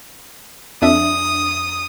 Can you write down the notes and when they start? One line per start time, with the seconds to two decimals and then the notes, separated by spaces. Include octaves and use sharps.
0.82 F2 D4 E5 D#6